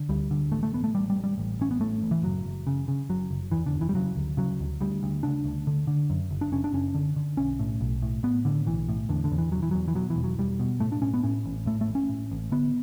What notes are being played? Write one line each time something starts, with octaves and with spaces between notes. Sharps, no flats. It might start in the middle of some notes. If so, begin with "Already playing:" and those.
Already playing: D3
D2 G3
D3
A1 A3
A3
A1 B3
A3
A1 G3
G3
A1
G3
A1
A1 C#4
B3
A2 A3
A1
E3
F#1 F#3
F#1
C#3
C#3
F#1 F#3
F#1
E2 E3
D3
F#1
E3
G3
C#3 F#3
D2
C#3 F#3
D2
D2 G3
D2
C#3 D4
D2
D3
D3
F#2
F#1
D4
F#1 C#4
D4
F#1 C#4
D3
D3
B1 C#4
A2
B1
A2
A2 B3
A2 D3
B1 E3
A2
E2 D3
D3
E2
E3
E1 F#3
E3
E2 F#3
E3
B2 F#3
E3
E1
F#3
E1 G3
B2
A2 A3
D4
A2 C#4
B3
A2 C#4
A1
A2 A3
A3
A1
C#4
A2
A1
D3 B3